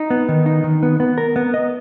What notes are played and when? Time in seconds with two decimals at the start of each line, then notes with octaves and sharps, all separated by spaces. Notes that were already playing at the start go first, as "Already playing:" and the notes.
Already playing: D#4
0.10 B3
0.29 D#3
0.46 D#4
0.64 D#3
0.83 B3
1.00 B3
1.18 A#4
1.36 B3
1.54 D#5